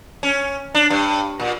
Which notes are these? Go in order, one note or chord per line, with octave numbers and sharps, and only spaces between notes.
C#4
D4
G2
A#2